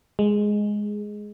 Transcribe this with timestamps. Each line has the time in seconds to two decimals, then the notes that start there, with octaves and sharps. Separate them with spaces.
0.19 G#3